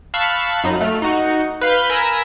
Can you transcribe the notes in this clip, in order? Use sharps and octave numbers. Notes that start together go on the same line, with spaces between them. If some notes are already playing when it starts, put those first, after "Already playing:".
F5 A5 B5 C#6 E6 F#6
F#2 F#3 D#4
A3 F6
D#4 F#4 C#7
B4 F5 G6
A#4 G#5 B5 E6 A#6